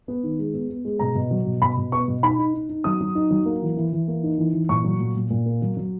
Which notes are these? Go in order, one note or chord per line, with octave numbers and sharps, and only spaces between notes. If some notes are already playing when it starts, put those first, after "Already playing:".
B3
D#3
G#3
B3
B3
G#3
B2 A#5
B2
F#3
B2
B2 B5
B2
B3 C#6
B2
D#4 B5
D#4
D#4
D#4
F#3 D#6
F#3
D#4
F#3
A#3
E3
E3
E3
A#3
D#4
E3
E3
A#2 C#6
F#3
A#2
A#2
A#2
A#3
F#3
F#3